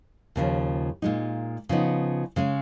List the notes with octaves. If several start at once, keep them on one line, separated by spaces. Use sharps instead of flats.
D#2 C#3 F3
A#2 G#3 D#4
C#3 F3 B3 D#4
C#3 G#3 C#4